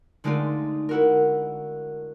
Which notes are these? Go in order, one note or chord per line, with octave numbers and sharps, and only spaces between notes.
D3 G#3 A3 D#4 F4 D5
E4 F#4 A#4